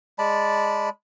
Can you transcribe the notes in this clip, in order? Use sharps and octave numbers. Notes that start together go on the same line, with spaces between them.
G#3 D5 A5 B5